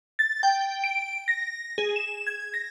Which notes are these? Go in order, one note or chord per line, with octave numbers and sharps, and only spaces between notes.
A6
G5
D7
A#6
G#4
E7
G#6
A#6